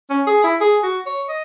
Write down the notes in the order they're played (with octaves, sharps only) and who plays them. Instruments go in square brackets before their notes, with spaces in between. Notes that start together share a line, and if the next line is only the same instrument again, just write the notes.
[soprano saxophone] C#4
G#4
E4
G#4
F#4
C#5
D#5